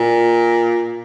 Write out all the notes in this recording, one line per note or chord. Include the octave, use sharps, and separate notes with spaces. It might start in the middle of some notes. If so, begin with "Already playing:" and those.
Already playing: A#2